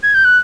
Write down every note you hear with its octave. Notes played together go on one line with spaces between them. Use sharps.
G#6
G6
F#6